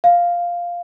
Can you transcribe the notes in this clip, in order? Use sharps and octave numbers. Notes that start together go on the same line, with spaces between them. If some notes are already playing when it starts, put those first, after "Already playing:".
F5